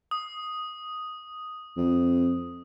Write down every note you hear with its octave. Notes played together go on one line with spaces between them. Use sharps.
D#6
F2